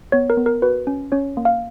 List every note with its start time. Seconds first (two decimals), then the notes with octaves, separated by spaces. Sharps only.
0.12 B3 C#5
0.30 A#4
0.37 B3
0.46 A#4
0.62 F#4 B4
0.87 C#4
1.12 C#4 C#5
1.37 A#3
1.45 F5